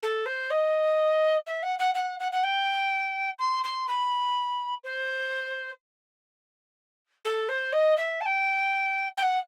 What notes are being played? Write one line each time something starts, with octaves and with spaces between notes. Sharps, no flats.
A4
C5
D#5
E5
F#5
F#5
F#5
F#5
F#5
G5
C6
C6
B5
C5
A4
C5
D#5
E5
A5
G5
G5
F#5